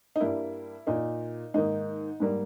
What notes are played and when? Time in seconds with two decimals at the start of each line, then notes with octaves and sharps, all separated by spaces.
0.16 D#4
0.20 G2 G3 A#3 E4
0.87 A#2 A#3 D#4
1.54 G#2 D#3 A#3 D#4
2.20 G#2 G3 A#3